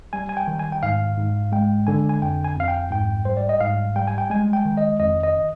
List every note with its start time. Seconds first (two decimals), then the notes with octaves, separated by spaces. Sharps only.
0.13 G3 G#5
0.29 G#5
0.37 G5
0.47 D#3
0.59 G#5
0.72 G5
0.83 G#2 F5
1.17 G#2
1.52 G#3 G5
1.87 D3 G#5
2.09 G#5
2.22 F2 G5
2.44 G#5
2.56 F2 F5
2.68 G5
2.91 G#2 G5
3.25 G3 C5
3.37 D5
3.49 D#5
3.61 G#2 F5
3.96 G3 G5
4.07 G#5
4.18 G5
4.30 G#3 G#5
4.53 G5
4.65 D#3
4.77 D#5
5.00 F2 D#5
5.23 D#5